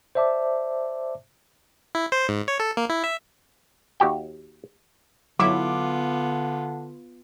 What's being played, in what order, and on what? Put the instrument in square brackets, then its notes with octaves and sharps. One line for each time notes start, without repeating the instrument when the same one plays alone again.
[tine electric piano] C5 D5 E5 A5 D6
[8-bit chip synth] E4
C5
G#2
C#5
A4
A#3
E4
E5
[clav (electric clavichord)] D#2 F#4 G4 G5
[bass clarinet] D3 [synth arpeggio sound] F#3 E4 E5 [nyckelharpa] B3 F4 [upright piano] D6